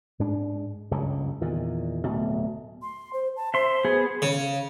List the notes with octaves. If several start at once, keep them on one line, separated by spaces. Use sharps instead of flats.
G#2 G#3 D4
F#1 C#2 G2 C#3
E2 A#2 D#3
D1 D2 B2 A3
C6
C5
A5
C5 E5 C6
B3 G#4
C#3